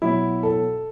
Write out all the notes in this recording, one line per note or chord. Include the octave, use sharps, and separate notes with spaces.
B2 F#3 E4
A4